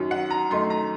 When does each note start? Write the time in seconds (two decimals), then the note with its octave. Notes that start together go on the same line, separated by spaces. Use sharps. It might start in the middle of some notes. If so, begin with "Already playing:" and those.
Already playing: F#2 D#3 F#3
0.11 F#5
0.30 A#5
0.51 F#2 D#3 A3 D#4 C6
0.70 A#5